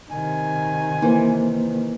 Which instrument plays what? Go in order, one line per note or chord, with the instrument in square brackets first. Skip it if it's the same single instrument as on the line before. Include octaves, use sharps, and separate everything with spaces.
[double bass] C3 D#3 [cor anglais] G#5
[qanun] E3 [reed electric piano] A#3 C5